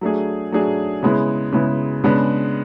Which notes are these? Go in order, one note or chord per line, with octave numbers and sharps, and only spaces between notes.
F#3 A3 D4 G#4
F#3 A3 D4 G#4
C#3 G#3 B3 E4
C#3 G#3 B3 E4
C#3 G#3 B3 D4